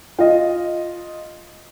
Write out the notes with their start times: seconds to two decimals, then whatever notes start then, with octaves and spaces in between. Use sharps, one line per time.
0.19 F4 D#5